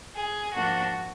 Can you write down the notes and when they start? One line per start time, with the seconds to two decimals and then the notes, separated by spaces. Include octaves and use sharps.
0.15 G#4
0.53 G#2 F3 A#3 D4 F#4